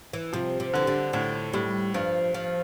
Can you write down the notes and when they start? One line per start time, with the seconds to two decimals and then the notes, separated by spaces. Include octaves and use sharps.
0.13 E3
0.33 C3 F3
0.60 C3
0.74 D3 E3
0.87 D3
1.13 A2 D3
1.53 A2 G3
1.94 G2 F3
2.34 F3